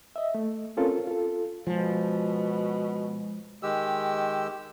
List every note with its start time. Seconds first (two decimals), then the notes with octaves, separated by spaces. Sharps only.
0.16 D#5 E5
0.35 A3
0.77 C4 C#4 F4 A4 A#4
1.07 F4 A4
1.67 B2 F3 G#3
3.63 D#3 G#3 G4 E6